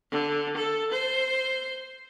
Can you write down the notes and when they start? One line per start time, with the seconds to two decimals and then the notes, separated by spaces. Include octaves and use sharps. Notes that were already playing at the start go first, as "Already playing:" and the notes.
0.11 D3
0.57 A4
0.92 C5